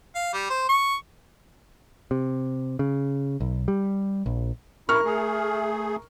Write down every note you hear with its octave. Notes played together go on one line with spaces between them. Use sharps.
F5
G3
C5
C#6
C3
C#3
B1
G3
A#1
E4 A#4 C#6 F6
A3 G#4